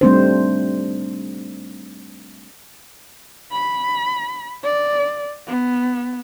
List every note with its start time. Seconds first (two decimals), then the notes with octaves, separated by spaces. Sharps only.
0.01 G3 A3 C4 D4 D#4 C5
3.52 B5
4.64 D5
5.47 B3